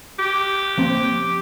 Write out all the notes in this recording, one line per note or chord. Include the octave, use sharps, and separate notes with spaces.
G4
F3 A#3 C4